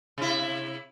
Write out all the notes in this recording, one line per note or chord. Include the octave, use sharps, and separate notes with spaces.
C3 E4